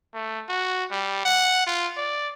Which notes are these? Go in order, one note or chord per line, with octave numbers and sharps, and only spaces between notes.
A3
F#4
G3
F#5
F4
D5